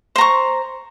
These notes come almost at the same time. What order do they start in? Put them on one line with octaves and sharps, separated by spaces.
C5 A#5 C#6